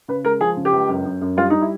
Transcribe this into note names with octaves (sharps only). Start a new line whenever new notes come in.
C#3 B4
G#3 A#4
F3 G#4
C#3
G4
C#2
F#2
F#2
F#2
G3 F4
G3 D#4
E4